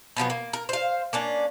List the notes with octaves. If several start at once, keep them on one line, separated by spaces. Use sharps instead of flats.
B2 F3 F#3 B3
A#3
A#4
C5 F5
A#3 C#4 D4